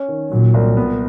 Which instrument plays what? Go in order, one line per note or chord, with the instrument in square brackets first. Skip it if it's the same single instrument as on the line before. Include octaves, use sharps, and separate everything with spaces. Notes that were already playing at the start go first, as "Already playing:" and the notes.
Already playing: [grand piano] C#4
D#3
[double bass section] A#2 [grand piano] F#3
[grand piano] C2
[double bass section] A#2 [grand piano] B3